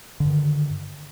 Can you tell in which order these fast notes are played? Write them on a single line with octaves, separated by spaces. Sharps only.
D3 G2 D#3